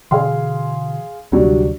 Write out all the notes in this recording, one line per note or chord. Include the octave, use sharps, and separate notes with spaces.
B2 D3 E3 G#4 F5 C6
D2 C3 F#3 G3 D4